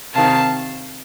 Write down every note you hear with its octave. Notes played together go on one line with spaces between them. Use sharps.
C3 D#3 F5 A5